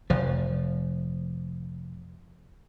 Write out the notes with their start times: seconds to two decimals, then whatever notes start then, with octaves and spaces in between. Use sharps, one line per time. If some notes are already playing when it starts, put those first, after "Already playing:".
0.10 F1 F3